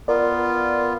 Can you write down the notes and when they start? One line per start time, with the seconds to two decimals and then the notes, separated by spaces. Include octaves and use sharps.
0.08 B3 F4 A#4 D5